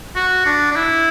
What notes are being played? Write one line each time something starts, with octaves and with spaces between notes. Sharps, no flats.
F#4
D4
D4
E4